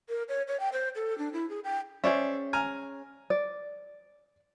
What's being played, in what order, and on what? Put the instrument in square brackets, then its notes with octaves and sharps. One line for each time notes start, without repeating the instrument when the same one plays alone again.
[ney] A#4
C#5
C#5
G5
C5
A4
D4
E4
G#4
G5
[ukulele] C#4 G#4 [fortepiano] C5 D5 E5
[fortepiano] G#5 A#5 F6
[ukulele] D5